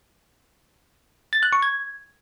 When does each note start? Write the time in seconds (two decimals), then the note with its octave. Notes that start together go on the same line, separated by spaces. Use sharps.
1.33 A6
1.43 F#6
1.53 C#6
1.62 G#6